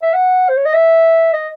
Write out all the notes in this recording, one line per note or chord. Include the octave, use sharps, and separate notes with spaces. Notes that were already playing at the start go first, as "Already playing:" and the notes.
E5
F#5
C5
C#5
D#5
E5
D#5